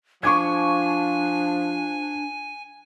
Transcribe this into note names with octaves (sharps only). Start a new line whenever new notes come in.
F3 D4 G#5 C#6 D6 G#6